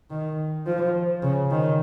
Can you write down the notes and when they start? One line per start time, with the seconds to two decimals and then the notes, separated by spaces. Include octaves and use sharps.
0.10 D#3
0.66 F3
1.23 C#3
1.50 D#3